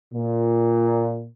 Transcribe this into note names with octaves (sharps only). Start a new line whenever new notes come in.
A#2